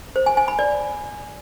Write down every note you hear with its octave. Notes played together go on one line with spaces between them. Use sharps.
C5
G#5
G#5
B5
D5